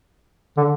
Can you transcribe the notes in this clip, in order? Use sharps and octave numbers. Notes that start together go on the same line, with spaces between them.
D3